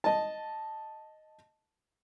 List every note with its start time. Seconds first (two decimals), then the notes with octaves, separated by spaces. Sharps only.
0.04 D#5 A5